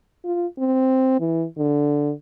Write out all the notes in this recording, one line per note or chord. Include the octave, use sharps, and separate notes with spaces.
F4
C4
E3
D3